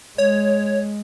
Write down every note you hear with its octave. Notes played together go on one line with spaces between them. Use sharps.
G#3 C#5